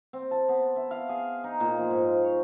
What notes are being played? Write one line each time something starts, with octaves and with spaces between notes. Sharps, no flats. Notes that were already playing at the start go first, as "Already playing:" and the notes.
C4
A5
B3
E4
F5
G#4
D#4
A#2
F3
G#2
C#5